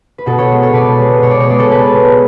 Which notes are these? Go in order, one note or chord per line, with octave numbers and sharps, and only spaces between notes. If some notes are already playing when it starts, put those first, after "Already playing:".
B4
B2 F#4 A4
A4 C#5
G#3 B3
A4 C#5
B2 B4 D5
G#3 B3
B2 C#5
D5
C#5
G#3 B3 D5
A4 C#5
B2 G#4 B4
G#3 B3